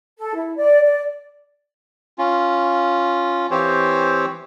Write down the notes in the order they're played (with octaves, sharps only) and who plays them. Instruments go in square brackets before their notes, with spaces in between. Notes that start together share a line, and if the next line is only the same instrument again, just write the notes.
[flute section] A4
E4
D5
D5
[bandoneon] C#4 F4
E3 C4 G4 C5 C#5